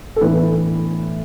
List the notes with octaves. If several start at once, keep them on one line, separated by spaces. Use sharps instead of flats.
A4
A2 E3 B3 D4 B4